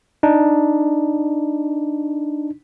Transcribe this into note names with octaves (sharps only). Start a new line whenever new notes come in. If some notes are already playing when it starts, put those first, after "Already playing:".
D4 D#4